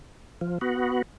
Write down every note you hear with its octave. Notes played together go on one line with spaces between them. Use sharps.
F3
B3 F#4